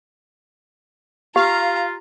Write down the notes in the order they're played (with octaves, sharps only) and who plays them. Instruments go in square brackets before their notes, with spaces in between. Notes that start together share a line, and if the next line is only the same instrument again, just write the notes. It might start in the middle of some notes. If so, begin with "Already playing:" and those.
[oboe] F4 [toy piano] G4 [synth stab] F5 [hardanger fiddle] A#5